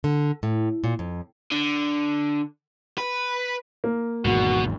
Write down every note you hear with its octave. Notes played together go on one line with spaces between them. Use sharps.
D3
A2
A#2
F2
D3
B4
A#3
G#1 E2 G#2 B2 F#4